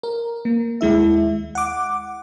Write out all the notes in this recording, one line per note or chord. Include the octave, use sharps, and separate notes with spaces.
A#4
A#3
D#2 G#3 E4 E5
F#5 D6